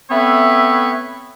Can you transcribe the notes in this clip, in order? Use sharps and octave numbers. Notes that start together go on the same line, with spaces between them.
A3 B3 C4 B4 C#5 E5